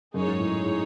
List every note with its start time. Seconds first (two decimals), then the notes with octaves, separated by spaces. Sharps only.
0.14 F#2 D#4 G#4 C#5
0.27 G#2
0.40 A2
0.65 A2